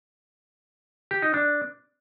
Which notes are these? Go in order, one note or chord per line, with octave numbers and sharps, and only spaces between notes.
G4
D#4
D4